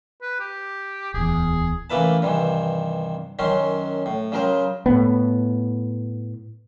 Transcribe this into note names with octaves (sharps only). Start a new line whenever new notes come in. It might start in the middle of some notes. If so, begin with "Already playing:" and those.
B4
G4
D1 E2 G#4
A1 E3 A#3 E4 B4 A5
G2 C3 D#3 E3
F#2 D#3 F#3 C#4 C6
A2
C#3 F#3 G#4 A#4 C5
A2 B3